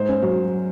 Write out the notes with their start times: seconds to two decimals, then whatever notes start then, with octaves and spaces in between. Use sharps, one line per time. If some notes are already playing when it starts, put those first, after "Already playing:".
Already playing: G#2 C5
0.09 C#4
0.22 F#3